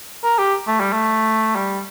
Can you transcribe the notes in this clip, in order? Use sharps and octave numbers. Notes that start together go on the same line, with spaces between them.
A#4
G4
A3
G3
A3
G3